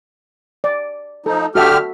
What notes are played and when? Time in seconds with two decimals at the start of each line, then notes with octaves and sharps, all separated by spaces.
0.64 D5
1.26 F3 D#4 A4
1.55 D3 F#4 G4 A4 E5 F6